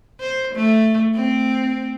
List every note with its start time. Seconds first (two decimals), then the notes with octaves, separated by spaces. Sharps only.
0.20 C5
0.55 A3
1.15 C4